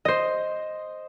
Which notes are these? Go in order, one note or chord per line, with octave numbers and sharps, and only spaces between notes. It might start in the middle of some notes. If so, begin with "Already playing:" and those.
C5 D#5